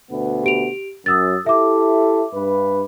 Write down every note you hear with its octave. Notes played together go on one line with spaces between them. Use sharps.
D2 B2 B3
G4 D7 F7
F#2 D#6 E6 A6
E4 G4 A4 E5 D6
G2 B4